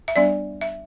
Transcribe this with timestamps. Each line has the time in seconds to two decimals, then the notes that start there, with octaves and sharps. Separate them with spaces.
0.08 E5
0.16 G3 B3 D4 D5
0.61 E5